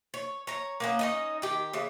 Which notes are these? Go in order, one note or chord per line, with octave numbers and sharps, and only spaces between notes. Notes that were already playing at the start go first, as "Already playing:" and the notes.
C#5
C#5 A#5
A#3 B3 C#4
C#4 D#4 D#5
D#3 G4
C#3 E3